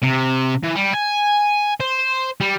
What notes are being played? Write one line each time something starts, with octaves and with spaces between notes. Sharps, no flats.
C3
E3
G3
G#5
C5
G3